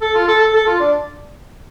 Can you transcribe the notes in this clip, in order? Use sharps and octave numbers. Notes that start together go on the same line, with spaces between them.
A4
F4
A4
A4
A4
F4
D4